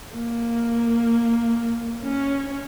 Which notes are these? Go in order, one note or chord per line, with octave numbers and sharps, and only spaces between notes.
A#3
C#4